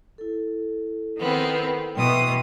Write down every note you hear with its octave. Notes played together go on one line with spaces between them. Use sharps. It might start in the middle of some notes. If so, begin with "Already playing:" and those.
E4 A4
D#3 B3 C4
B2 E3 G5 C6 D#6